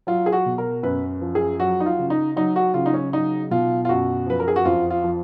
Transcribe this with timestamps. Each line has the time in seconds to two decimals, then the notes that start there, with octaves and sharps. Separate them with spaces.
0.07 F#3 F4
0.26 G#4
0.32 F#4
0.46 B2
0.58 A#4
0.83 F#2 B4
1.21 F3
1.35 G#4
1.60 F#3 F#4
1.80 D#4
1.86 F4
1.99 C#3
2.10 D#4
2.36 F#3 D#4
2.56 F#4
2.74 C#3 F4
2.86 D#4
2.94 C#4
3.13 F#3 D#4
3.51 B2 F4
3.85 F4
3.89 F#2 F#4
4.27 F3 B4
4.40 A#4
4.48 G#4
4.56 F#4
4.65 F2 F4
4.90 F4
5.04 F3